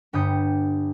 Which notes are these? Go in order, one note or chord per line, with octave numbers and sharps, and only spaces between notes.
G1 G2 G4 D#6 G6 C#7